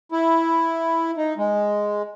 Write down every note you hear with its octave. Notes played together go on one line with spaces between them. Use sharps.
E4
D#4
G#3